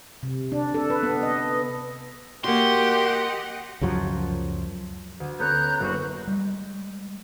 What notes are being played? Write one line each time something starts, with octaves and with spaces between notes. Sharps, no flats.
C3
D4
A4
B4
B3
D#5
A#3 F#4 G4 D#5 F#5 C6
C#2 F#2 F3 F#3
D2
B3 C#4 A4 A#5 F#6 G6
F#1 D4 F#4
G3 G#3